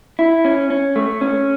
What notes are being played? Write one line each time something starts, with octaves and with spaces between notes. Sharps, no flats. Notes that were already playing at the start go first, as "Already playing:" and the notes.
E4
C#4
C#4
A3
C#4